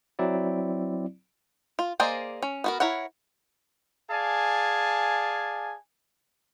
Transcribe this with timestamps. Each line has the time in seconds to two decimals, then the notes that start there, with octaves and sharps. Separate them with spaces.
0.19 F#3 C4 E4 D5
1.79 F4
2.00 A#3 G#4 C5 D5 D#5
2.42 C#4
2.64 B3 F#4 A#4
2.80 E4 A#4 C#5 F#5
4.10 G#4 D5 F5 G#5 A5